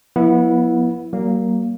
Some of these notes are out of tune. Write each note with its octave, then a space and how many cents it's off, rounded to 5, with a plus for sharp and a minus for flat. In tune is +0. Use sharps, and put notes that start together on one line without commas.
F3 +35 B3 -25 E4 +0
F#3 +45 A#3 +0